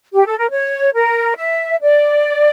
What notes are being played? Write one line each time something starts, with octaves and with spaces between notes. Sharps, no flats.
G4
A4
A#4
C#5
A#4
E5
D5